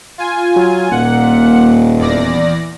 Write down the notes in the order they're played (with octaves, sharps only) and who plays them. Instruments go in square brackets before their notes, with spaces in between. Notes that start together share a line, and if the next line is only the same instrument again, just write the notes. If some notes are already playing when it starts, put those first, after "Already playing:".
[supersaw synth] F4 G#5
[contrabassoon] F#3
[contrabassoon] D#1 [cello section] A#2 [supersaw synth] F#5
[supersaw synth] E2 D5 A#6